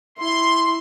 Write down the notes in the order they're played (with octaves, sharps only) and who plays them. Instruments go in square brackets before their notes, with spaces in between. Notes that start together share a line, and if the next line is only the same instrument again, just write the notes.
[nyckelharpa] E4 [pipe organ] C6